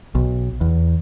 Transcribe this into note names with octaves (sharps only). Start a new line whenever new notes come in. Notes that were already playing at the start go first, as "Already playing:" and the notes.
B1
E2